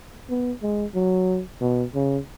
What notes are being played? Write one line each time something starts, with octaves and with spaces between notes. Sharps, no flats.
B3
G#3
F#3
B2
C#3